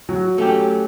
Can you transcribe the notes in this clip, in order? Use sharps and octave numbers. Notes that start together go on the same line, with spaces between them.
F#3
A3 C#4 G4